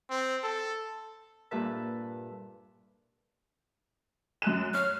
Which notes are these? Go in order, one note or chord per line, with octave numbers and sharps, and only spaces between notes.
C4
A4
G2 A#2 A4 B4 E5 A5
F#2 F#6 E7
C#5 F6